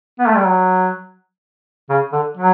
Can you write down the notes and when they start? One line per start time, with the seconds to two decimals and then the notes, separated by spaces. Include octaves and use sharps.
0.19 B3
0.28 A3
0.36 G3
0.45 F#3
1.90 C#3
2.12 D3
2.37 F#3